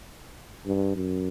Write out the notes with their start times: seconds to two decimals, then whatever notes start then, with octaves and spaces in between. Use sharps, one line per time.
0.66 G2
0.96 F#2